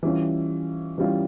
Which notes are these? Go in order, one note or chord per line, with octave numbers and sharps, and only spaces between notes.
E3 G3 C#4 F4
E3 G3 C#4 F4